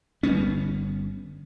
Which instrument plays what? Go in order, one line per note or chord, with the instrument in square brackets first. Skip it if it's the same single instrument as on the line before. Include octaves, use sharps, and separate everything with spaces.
[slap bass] G1 G3 B3 C#4